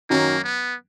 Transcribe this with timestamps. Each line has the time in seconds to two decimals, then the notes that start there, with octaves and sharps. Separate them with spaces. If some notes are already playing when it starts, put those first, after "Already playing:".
0.10 F#2 D#3 F#3 A#3 C#4
0.44 B3